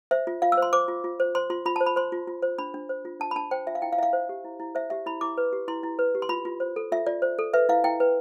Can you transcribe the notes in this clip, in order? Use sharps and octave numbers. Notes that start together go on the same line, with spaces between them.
C5 E5
F4
F4 F5
E6
C5
C6
C5 D6
F4
F4
C5
C5 C6
F4 C6
F4 B5
A5
C5
B5
C5 C6
F4
F4
C5
D4 B5
D4
C5
F4
D4 A5
B5
D4 A5
C5 G5
F4 E5
F5
E4 G5
F5
E4 E5 F5
C5
G4
E4
E4
C5 E5
G4 E5
E4 B5
E4 D6
B4
G4
E4 C6
E4
B4
G4
C6
F4 B5
F4
C5
A4
F4 E5
F4 D5
C5
A4
B4 E5
E4 F5
E4 G5
B4